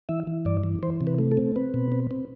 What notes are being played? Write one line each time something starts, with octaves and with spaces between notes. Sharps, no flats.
E3 E5
E3
G2 D5
E3
E3 C5
C3
B4
A3
A4
C4
C4 B4
B2
C4
C4